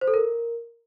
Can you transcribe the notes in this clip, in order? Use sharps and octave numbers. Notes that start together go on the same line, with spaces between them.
C5
A4
A#4